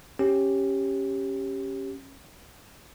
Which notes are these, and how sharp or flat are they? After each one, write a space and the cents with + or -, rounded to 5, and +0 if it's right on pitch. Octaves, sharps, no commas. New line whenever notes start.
C#4 -15 G4 +0